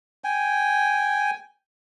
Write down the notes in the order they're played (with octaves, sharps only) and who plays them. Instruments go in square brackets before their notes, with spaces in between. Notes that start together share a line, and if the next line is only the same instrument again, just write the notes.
[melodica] G5 G#5